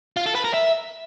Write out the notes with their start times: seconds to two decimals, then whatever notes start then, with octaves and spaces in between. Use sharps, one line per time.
0.17 F4
0.26 A4
0.35 B4
0.45 A#4
0.54 E5